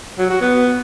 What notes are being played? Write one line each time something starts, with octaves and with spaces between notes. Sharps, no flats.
F#3
F#4
B3